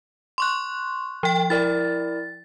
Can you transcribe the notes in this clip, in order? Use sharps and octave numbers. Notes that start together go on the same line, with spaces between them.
C6 C#6 F#6
F3 G5
E4 A#4 D5 A6